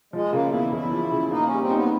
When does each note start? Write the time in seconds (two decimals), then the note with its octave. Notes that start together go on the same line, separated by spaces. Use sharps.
0.13 F3 G#3
0.32 C#3 A#3
0.52 E2 E4
0.72 E2 E4
0.91 F3
1.12 C#3
1.31 A#3 D#4
1.46 G3 C#4
1.61 C4
1.71 D#4
1.76 B3